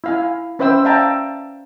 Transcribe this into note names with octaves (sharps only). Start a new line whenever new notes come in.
E4 F5 G#5
C#4 B4 C5 E5 G5 E6
D5 E5 F5 G5 A5 A#5